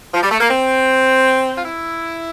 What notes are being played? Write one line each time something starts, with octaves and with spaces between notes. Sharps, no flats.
F3
G3
A3
A#3
C4
F4
E4